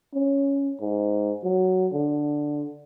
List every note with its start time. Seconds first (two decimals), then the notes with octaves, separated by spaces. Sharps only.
0.14 C#4
0.81 G#2
1.44 F#3
1.93 D3